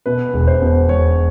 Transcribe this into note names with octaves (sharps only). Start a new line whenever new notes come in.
B2 B4
E1
C5
B2
E1 C#5